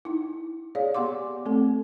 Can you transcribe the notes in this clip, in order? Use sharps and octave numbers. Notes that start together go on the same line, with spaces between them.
D#4 E4
G#4 C#5 D5 F5
B3 G4 F#5 C6 D6
A3 C4 A4